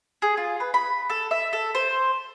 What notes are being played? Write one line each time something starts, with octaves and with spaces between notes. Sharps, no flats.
G#4
F4
B4
B5
A4
E5
A4
C5